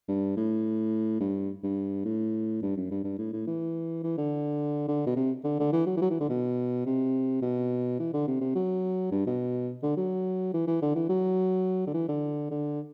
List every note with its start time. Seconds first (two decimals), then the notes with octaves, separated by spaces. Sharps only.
0.08 G2
0.37 A2
1.20 G2
1.63 G2
2.05 A2
2.62 G2
2.77 F#2
2.91 G2
3.04 G2
3.18 A2
3.33 A2
3.47 E3
4.03 E3
4.18 D3
4.88 D3
5.06 B2
5.16 C3
5.44 D3
5.59 D3
5.72 E3
5.86 F#3
5.97 E3
6.01 F#3
6.10 E3
6.20 D3
6.29 B2
6.86 C3
7.42 B2
7.99 E3
8.13 D3
8.27 C3
8.41 C3
8.55 F#3
9.12 G2
9.26 B2
9.83 D3
9.97 F#3
10.54 E3
10.67 E3
10.82 D3
10.95 E3
11.09 F#3
11.87 D3
11.94 E3
12.08 D3
12.51 D3